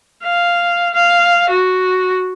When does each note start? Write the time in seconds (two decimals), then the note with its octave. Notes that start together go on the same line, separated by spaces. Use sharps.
0.24 F5
0.94 F5
1.50 F#4